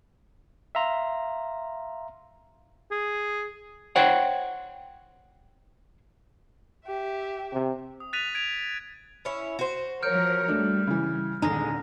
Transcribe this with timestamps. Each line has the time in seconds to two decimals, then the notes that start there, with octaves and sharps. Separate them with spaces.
0.75 E5 F5 A#5 C6
2.91 G#4
3.96 C5 C#5 F#5 G5
6.87 G4 E5
7.53 C3
8.00 D#6
8.13 F#6 A6 B6 D#7 F7
8.35 G#6 D7 F7
9.25 C#4 E4 C#5
9.59 F#4 C5
10.03 F3 A#4 C#5 F6 G6 D7
10.48 G3 A3 D4
10.87 C#3 E3
11.42 D#1 D3 G#3 A#5 A#6